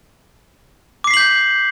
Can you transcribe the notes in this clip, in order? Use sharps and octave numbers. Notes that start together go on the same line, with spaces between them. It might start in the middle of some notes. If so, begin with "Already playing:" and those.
D6 G6 B6 C7 F#7